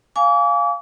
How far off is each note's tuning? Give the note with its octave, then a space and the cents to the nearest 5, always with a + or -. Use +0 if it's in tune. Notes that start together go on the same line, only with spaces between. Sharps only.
F5 +0 G#5 +0 D6 -40